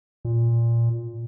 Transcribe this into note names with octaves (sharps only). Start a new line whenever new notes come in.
A#2